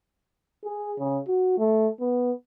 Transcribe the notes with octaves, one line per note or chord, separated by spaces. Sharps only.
G#4
C#3
F#4
A3
B3